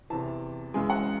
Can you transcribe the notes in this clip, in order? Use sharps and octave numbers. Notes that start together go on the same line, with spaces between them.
E2 C3 E3 A5
F#2 C#3 E3 G#3 G#5
F#5